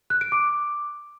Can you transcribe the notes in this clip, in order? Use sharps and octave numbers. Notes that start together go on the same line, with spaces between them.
F#6
D7
D6